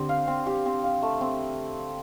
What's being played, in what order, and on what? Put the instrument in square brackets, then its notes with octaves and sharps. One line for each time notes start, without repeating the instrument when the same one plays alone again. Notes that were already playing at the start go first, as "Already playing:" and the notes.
Already playing: [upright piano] D3 [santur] C4 G4
[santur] F5
C4
G4
C4
F5
A3
C4